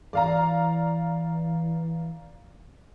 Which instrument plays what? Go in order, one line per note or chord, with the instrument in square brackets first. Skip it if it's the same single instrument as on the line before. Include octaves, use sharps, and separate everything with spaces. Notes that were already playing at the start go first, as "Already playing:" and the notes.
[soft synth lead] E3 [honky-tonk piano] D5 F5 A#5